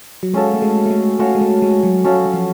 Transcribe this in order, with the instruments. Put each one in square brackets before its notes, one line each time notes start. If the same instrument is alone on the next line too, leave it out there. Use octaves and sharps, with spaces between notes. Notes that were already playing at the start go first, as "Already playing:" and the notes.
[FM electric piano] F#3
[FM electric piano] G#3 [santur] C#4 F#4 A4 F5
[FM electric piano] A3
G#3
A3
G#3
[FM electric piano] A3 [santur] C#4 F#4 A4 F5
[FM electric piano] G#3
A3
G#3
F#3
[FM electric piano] F#3 [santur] C#4 F#4 A4 F5
[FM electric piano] F#3
F3